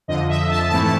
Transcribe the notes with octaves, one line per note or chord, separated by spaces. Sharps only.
F2 D3 F3 D#5
E5
A5
G#2 E3 A3 C4 E4 A5
A5